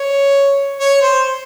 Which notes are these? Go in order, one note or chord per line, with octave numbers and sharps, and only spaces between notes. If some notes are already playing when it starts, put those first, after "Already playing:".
Already playing: C#5
C#5
C5